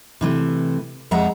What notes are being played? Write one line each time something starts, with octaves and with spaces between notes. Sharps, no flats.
C3 E3 A3
F2 G#3 E5 F#5 A#5